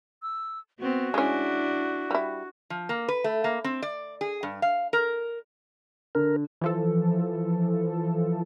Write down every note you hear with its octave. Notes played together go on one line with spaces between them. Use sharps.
E6
B3 C4 F#4
G#3 C#4 D4 E4
G3 E4
F3
A#3
B4
A3
A#3
C4
D5
G#4
G2
F5
A#4
D3 A#4
E3 F3 A4